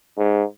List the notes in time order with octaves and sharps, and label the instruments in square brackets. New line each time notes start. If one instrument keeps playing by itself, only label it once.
[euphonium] G#2